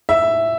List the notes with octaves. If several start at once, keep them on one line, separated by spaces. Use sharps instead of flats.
E5